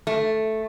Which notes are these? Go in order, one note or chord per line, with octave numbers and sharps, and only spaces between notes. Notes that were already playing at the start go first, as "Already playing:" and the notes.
A3